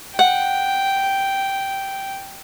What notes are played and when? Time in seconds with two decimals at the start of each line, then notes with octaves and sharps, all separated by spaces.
0.19 F#5 G5